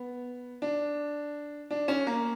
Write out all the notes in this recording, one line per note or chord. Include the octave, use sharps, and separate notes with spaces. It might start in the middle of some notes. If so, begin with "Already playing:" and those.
Already playing: B3
D4
D4
C#4
A#3